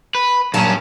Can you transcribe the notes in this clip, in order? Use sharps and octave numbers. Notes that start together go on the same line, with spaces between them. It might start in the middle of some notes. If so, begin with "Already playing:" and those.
B4
G2 A#2 F#3 C#4 A5